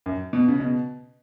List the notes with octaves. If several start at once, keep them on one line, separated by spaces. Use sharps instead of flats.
F#2
B2
C#3
B2